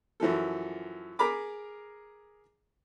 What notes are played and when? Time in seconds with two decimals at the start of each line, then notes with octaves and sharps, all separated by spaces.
0.20 F#2 E3 F3 A4
1.19 G#4 A#4 A#5 B5 D6